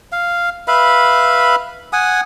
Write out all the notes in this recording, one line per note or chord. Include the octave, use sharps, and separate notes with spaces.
F5
B4 E5 F5 B5
F#5 G#5 D#6